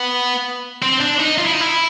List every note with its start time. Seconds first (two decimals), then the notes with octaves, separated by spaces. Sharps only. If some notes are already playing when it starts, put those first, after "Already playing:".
Already playing: B3
0.83 C4
1.01 D4
1.20 D#4
1.38 F4
1.46 E4
1.53 D#4
1.60 E4